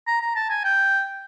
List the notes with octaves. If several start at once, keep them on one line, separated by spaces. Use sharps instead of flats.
A#5
A#5
A5
G#5
G5